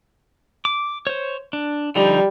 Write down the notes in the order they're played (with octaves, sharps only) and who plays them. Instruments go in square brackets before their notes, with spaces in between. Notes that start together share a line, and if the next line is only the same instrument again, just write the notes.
[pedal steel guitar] D6
C5 C#5
D4
[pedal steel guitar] D3 F3 D#4 [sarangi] G3